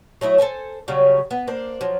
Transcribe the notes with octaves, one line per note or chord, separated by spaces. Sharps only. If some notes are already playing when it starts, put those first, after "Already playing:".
F#3 A3 E4 D#5
A4 A#4 C5 G#5
C#3 F#3 G3 C#4
B3
A#3 D4 C5
F3 F#3